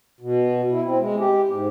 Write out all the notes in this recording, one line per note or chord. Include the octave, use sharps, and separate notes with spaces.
B2
E4
C4
G#3
G4
G#2